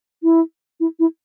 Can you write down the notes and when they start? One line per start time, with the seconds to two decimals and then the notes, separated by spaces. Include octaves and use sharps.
0.23 E4
0.80 E4
0.99 E4